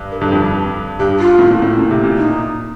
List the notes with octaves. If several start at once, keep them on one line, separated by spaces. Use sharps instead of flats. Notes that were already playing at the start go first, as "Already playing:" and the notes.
Already playing: G2
A#4
G2 A4
F2
G2
G2 G4
F4
A2
A#2
A2
A#2
C3
A#2
D#4